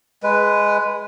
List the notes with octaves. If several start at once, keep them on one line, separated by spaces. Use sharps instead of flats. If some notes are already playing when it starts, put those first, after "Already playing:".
G#3 B4